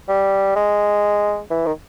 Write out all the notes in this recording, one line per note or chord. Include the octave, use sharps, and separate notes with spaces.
G3
G#3
E3
D#3